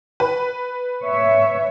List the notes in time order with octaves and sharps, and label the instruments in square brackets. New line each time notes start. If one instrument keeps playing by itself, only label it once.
[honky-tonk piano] B4
[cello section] C#5 E5